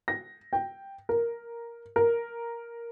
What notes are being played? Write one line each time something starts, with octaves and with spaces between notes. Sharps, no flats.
A#6
G5
A#4
A#4